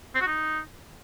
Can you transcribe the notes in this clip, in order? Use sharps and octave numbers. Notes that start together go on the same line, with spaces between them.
C4
F#4
D#4